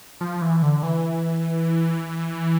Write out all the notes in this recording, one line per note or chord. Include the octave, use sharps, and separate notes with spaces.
F3
E3
D3
E3